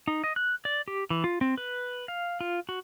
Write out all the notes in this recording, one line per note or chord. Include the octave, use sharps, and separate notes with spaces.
D#4
D#5
F#6
D5
G4
E3
F4
C4
B4
F5
F4
F#4